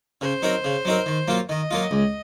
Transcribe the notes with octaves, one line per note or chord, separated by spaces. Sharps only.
C#3 C5
F#3 C4 D#4 A#4
C#3
F#3 C4 D#4 A#4
D#3
F#3 A#3 F4
D#3 D#5
F#3 A#3 F4
C#2